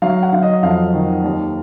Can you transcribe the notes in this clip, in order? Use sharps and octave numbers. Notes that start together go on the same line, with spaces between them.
F#3 F5
F#5
F#3 F5
D#5
F2 F5
D#3
D#2